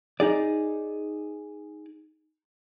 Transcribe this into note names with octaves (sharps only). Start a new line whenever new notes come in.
D#4 G#4 D5